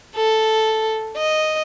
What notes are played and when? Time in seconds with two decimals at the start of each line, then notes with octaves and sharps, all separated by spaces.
0.16 A4
1.17 D#5